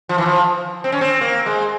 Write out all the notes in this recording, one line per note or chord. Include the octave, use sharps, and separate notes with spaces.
F3
E3
F3
C4
C#4
C4
A#3
G#3